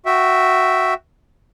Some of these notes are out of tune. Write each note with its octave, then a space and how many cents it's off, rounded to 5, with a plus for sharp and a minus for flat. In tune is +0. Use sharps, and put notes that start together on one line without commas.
F#4 +0 E5 +0 G5 -20